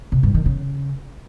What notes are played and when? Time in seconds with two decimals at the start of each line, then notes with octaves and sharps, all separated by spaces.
0.12 C3
0.23 G2
0.34 D#3
0.46 C#3